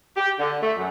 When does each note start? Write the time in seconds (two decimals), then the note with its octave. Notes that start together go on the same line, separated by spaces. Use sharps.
0.16 G4
0.38 D3
0.61 A3
0.77 F#2